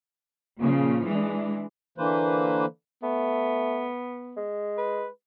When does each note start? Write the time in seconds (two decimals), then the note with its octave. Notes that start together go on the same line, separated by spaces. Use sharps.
0.59 A#2 C#3 F3
1.05 E3 G#3 D4
1.98 D3 E3 A#3 B4 C5
3.03 A3 B3
4.37 G#3
4.78 B4